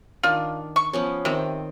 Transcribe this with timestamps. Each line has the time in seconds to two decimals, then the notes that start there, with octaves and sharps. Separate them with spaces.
0.23 D#3 D4 F4
0.76 C#6
0.93 F3 B3 C#4
1.25 C3 D#3 C4